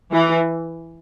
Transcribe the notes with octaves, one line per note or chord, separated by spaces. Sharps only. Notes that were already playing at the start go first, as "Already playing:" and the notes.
E3